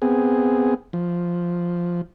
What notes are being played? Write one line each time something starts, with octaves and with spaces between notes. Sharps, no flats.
B3 C4 G#4
F3